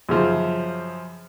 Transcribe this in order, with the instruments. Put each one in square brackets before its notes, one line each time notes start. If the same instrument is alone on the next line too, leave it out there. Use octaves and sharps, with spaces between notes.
[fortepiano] F#2 C#3 F3